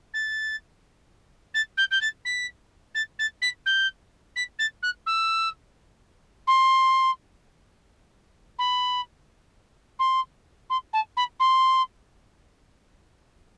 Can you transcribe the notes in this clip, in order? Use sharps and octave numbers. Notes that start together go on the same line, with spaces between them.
A6
A6
G6
G6
A6
B6
A6
A6
B6
G6
B6
A6
F#6
E6
C6
B5
C6
C6
A5
B5
C6